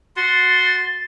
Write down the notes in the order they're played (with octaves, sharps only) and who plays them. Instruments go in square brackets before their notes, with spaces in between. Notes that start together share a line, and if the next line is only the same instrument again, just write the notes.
[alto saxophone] F#4 [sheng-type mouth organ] C6 [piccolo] A6